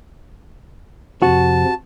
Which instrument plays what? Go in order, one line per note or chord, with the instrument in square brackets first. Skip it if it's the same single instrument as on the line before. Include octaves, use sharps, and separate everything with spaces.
[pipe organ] F2 C3 F3 [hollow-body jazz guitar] F#4 [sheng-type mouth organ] A5